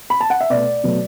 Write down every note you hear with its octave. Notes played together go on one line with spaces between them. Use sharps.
B5
A5
F#5
E5
B2 A3 D5
B2 F#3 A3